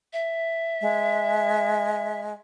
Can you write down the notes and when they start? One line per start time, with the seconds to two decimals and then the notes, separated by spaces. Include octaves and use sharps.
0.13 E5
0.81 G#3